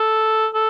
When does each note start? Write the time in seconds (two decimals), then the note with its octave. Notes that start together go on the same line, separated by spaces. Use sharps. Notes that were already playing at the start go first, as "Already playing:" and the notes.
Already playing: A4
0.54 A4